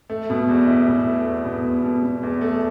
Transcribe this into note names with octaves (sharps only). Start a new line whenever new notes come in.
A3
B2
E2
E4
B2
A3
E2
B2
E2
B2
B2
E2
A3